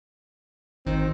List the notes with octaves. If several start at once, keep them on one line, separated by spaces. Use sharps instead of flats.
G#1 D#3 C4 D#4